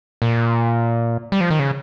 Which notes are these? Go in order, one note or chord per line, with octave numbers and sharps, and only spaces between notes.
A#2
G3
F3
D#3
C#3